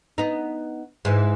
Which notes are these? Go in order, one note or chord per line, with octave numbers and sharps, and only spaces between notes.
B3 D#4
G#2 E3